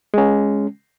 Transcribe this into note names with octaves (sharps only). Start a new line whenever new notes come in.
G#3 C#4